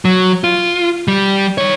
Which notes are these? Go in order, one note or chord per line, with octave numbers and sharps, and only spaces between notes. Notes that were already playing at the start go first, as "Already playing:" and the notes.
F#3
F4
G3
D#3 C#5